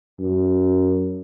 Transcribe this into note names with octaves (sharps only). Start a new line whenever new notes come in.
F#2